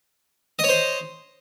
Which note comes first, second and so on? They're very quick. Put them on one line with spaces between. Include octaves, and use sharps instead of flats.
D#5 C#5 C5